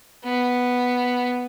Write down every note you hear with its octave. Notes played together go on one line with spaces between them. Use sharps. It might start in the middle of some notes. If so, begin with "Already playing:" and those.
B3